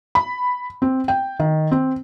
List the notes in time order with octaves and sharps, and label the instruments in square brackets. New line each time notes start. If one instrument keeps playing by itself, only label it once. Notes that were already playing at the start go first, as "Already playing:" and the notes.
[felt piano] B5
C4
G5
D#3
C4